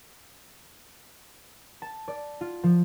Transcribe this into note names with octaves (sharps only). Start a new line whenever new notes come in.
A5
D5
F4
F3